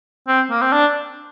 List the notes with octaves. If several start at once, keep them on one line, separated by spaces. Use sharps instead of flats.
C4
A#3
C4
D4